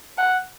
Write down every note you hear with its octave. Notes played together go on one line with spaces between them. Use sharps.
F#5